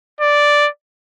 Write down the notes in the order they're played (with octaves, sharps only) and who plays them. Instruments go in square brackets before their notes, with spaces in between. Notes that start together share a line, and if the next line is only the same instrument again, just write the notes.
[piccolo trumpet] D5